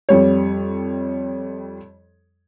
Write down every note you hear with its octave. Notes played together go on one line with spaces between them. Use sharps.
F2 G3 C#5